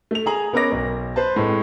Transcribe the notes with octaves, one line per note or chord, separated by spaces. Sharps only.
A3 F7
G#4 G#5 A#5 F#7
B3 C#4 A#4 D#5 D6 A#6
B1
B4 C5 A5
A2 G#3 C4